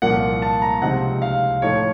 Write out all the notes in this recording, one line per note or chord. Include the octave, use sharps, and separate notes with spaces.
C2 A#2 F3 A#3 F#5
A5
A#5
C#2 C3 F3 C4 D#4 F#5
F5
A2 F3 A3 D#4 C#5